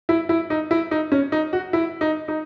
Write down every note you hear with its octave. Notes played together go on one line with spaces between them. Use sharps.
E4
E4
D#4
E4
D#4
C#4
D#4
F#4
E4
D#4
D#4